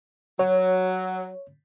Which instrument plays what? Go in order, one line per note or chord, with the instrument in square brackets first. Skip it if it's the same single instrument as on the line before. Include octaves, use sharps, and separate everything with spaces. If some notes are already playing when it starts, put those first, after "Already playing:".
[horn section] F#3 [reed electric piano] C#5